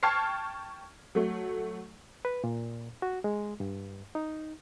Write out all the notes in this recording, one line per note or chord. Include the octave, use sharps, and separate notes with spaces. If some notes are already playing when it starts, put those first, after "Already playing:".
G5 A5 C#6 F6 G#6 C7
F#3 A3
B4
A#2
F#4
G#3
G2
D#4